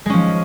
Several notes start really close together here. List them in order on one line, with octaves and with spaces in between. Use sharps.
G#3 C#4 F3